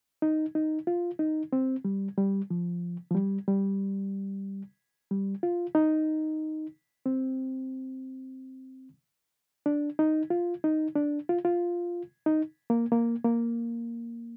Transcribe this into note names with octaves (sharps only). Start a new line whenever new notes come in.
D#4
D#4
F4
D#4
C4
G3
G3
F3
F3
G3
G3
G3
F4
D#4
C4
D4
D#4
F4
D#4
D4
F4
F4
D#4
A#3
A#3
A#3